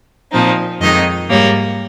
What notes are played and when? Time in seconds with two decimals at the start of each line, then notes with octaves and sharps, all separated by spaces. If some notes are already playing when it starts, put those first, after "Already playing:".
0.31 A#2 F3 C4 D#4
0.80 F2 D#3 G#3 D#4 D#5
1.29 G#2 G3 A#3 C#5